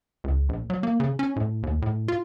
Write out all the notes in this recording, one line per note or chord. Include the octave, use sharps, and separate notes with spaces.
C#2
A#1
F#3
A#3
C#3
C#4
A2
D#2
A2
F4